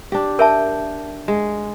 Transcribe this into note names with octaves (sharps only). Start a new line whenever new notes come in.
D4 G4
A#4 E5 G5 A5
G#3